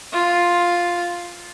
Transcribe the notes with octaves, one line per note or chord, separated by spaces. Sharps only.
F4